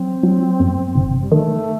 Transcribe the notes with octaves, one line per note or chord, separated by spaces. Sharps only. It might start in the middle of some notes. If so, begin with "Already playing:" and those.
Already playing: F#3 C4
F#3
F#2
G1
G3
D#3 A3